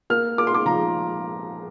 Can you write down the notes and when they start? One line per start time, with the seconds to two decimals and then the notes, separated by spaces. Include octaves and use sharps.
0.10 A#3 F6
0.38 A#3 D6
0.47 C6
0.54 D6
0.66 F3 A#5